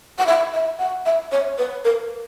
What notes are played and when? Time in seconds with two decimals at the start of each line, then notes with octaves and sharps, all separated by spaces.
0.19 F#5
0.26 E5
0.53 E5
0.79 F#5
1.06 E5
1.32 C#5
1.58 B4
1.84 A#4